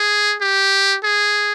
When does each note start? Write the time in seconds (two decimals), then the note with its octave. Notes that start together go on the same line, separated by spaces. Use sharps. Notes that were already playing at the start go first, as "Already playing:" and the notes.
Already playing: G#4
0.41 G4
1.04 G#4